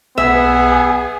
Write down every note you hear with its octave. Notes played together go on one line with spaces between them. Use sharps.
B1 B3 G#4 E5